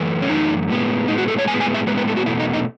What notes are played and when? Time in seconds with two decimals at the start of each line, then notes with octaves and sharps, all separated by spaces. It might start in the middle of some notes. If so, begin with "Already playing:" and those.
Already playing: F#2 E3 A3
0.22 C#4
0.30 F#2 E3 A3 D#4
0.69 A2 G#3 B3
1.08 A2 G#3 B3 D#4
1.18 F#4
1.28 A4
1.39 C#5
1.48 A2 G#3 B3 G#5
1.61 G#5
1.74 E5
1.87 A2 G#3 B3 B4
1.98 B4
2.08 A4
2.17 F#4
2.26 E2 B2 A3 E4
2.40 D#4
2.53 D#4